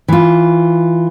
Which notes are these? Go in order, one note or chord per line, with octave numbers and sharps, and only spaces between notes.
E3 F4